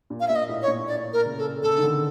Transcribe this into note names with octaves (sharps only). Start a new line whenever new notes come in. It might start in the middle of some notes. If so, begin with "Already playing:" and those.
A#2
F5
A#2 E5
D#5
A2
C#5
A#2
D5
A#4
C#3
A4
C#3 A4
D#3
D3